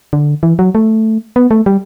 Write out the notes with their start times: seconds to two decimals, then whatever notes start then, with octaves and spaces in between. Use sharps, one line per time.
0.13 D3
0.43 E3
0.59 F#3
0.75 A3
1.36 B3
1.51 A3
1.66 G3